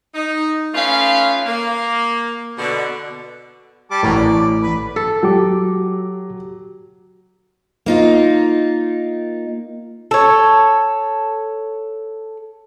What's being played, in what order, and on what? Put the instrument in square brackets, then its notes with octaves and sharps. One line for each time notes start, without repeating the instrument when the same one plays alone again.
[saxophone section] D#4
A3 C#4 D#4 F4 B4 F5
A#3
B2 D3
[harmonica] G3 A5 D6
[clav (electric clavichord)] A1 A2 [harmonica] F#3 A#3
[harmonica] D5
B4
[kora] A4
[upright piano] F#3 [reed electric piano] F#4 G4 D6
[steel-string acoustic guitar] A#3 D#4 F4
[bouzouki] A4 C#5